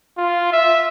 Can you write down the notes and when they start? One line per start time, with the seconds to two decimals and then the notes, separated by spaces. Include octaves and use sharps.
0.17 F4
0.53 E5